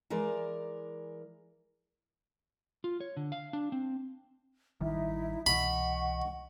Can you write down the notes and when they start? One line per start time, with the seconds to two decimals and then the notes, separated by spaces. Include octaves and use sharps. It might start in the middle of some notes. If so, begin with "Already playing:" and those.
0.10 E3 G#3 A#4 D5
2.84 F4
3.01 C#5
3.17 D3
3.32 F5
3.53 D4
3.72 C4
4.81 A1 D#3 G3 D#4 E4 E5
5.46 C2 B2 E3 D#5 F#5 B5 C#6